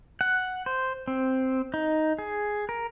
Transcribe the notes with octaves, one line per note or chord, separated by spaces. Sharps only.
F#5
C5
C4
D#4
G#4
A#4